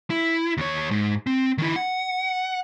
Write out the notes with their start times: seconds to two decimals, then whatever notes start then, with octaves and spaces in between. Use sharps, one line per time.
0.10 E4
0.57 D#2 C#5
0.91 G#2
1.27 C4
1.58 D#3 E4
1.76 F#5